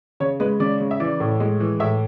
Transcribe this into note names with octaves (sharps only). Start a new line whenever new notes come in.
C#3 C#5
G#3 B4
C#3 D5
C#3
E5
E3 D5
A2
G#3
E3
A2 E5